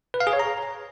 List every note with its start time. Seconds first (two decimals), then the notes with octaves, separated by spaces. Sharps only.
0.14 B4
0.20 F5
0.27 G#4
0.33 C#5
0.40 A#5